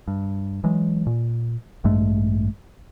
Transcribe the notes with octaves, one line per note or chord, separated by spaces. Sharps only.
G2
E3 F#3 G#3
A#2
A1 G2 G#3 A3